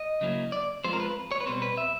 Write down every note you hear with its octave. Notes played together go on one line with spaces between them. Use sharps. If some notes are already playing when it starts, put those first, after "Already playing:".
Already playing: D#5
C#3 F#3 A#3 C#4 E4
D5
F3 G#3 C4 F4 C5
A#4
B4
C#5
B4
B2 G3 C4 C5
B4
E5